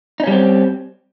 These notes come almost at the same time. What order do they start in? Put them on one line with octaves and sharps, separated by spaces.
D#4 C#4 G3 C4